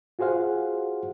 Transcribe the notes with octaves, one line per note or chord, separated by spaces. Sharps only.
F4 F#4 G#4 C5 F5 F#5